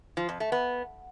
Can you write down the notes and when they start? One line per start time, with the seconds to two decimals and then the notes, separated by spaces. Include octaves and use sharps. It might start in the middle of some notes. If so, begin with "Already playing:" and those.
0.17 F3
0.29 F2
0.40 A3
0.52 B3